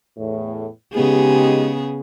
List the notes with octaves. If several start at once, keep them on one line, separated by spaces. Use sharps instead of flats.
E2 A2
C#3 G#3 B3 D#4 G4 G#4